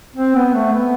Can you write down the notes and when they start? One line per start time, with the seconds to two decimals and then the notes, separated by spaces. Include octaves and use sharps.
0.16 C4
0.35 B3
0.54 A3
0.73 B3